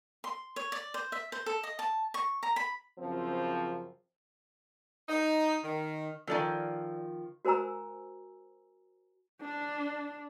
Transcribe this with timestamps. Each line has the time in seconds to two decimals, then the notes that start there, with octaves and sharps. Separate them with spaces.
0.24 C6
0.56 C#5
0.72 D5
0.94 C5
1.12 E5
1.32 C5
1.46 A4
1.63 D#5
1.79 A5
2.14 C#6
2.43 A#5
2.56 B5
2.99 F#2 C#3 F3 C4
5.09 D#4
5.63 D#3
6.27 D#3 F3 A4 D5 G#5
7.45 F#4 A#4 C5 G#5 A#5 E6
9.42 D4